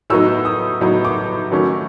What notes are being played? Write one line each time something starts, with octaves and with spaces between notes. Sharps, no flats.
A2 F#3 B3 D#4 E6
D#6
A2 F#3 B3 D#4
D6
D#3 F#3 A3 C#4